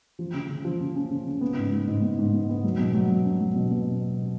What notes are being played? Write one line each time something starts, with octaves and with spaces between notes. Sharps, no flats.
F3
C#3
C#3
F3
C#3
C#4
C#3
C#3
B3
G#2
G#2
G#2
B3
G#2
B3
B3
F#3
B2
F#3
B2
C#4
F#3
B2
B2